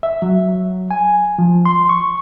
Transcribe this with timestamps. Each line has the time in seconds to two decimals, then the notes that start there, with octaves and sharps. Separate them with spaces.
0.03 E5
0.22 F#3
0.91 G#5
1.38 F3
1.65 C6
1.89 C#6